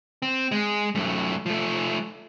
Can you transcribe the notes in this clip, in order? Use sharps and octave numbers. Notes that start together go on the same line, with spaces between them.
C4
G#3
F#2 A3
F3 A3